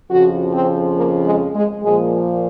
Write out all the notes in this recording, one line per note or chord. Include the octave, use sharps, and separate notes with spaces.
F2 C#3 F3 F#4
C4
A#3
G#3
G#3
A#2 F3 G#3